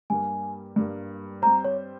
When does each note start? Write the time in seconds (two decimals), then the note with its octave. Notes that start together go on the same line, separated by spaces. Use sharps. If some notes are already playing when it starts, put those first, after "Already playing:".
0.10 G2 G3 A#3 G#5
0.76 G2 G3 A#3
1.42 G3 C4 G4 C5 A#5
1.65 C#5